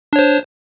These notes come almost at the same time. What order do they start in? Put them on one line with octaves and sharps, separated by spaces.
D4 C#5 C5